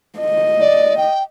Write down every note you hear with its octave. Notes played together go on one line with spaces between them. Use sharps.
D#5
D5
G5